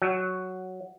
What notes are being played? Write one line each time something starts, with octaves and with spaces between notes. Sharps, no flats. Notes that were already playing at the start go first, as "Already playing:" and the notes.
F#3